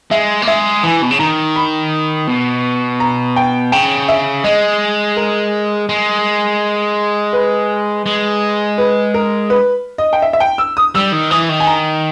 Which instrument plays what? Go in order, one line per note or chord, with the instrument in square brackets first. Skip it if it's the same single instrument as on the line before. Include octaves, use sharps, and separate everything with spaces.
[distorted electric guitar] G#3 [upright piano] E5
[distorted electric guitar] A#3
[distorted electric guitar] G#3 [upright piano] E5
[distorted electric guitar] E3 [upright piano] G#5
[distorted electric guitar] B2
C#3
[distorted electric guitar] D#3 [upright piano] A#5
[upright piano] B5
[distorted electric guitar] B2
[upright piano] A#5
G5
[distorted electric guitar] C#3 [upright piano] G5
[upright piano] E5
[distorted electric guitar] G#3 [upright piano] D#5
[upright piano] A#4
[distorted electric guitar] G#3
[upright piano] B4
[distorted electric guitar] G#3
[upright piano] B4
A#4
B4
D#5
G5
E5
E5
G5
E6
D#6
[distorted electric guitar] G3 [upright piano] E6
[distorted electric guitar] D#3
[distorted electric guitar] E3 [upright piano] D#6
[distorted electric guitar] D#3
[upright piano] G#5
A#5